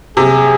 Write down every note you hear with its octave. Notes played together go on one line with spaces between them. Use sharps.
C3 G#4